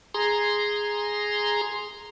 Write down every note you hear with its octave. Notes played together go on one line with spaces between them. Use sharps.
G#4 A#5 C6